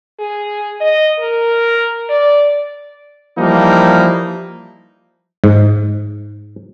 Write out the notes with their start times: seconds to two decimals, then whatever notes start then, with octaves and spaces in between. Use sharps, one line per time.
0.19 G#4
0.81 D#5
1.19 A#4
2.09 D5
3.38 E3 F3 G3 A#3 D#4 E4
5.44 G#2